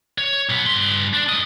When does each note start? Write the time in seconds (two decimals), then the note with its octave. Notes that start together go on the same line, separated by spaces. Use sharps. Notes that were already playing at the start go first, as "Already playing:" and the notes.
0.18 C#5
0.49 B1 B3
0.67 G2 C6
1.14 D4
1.29 E2 D#5